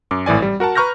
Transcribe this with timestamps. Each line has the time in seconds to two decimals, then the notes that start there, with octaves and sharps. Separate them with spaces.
0.11 F#2 D6
0.26 G#1 A2 E3 D5 G#5
0.42 G3
0.60 F#4 A#4 F#5 A5
0.75 B4 A#5 C#6 F6 G6 A#6